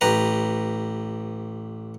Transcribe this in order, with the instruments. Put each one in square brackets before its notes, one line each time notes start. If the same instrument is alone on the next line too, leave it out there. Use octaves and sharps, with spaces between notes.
[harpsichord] A1 G4 B4 A#5